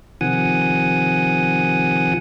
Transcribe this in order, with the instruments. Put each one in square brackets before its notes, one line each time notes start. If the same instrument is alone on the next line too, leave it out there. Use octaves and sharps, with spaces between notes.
[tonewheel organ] C3 D#3 F3 F#5 G#5 D#6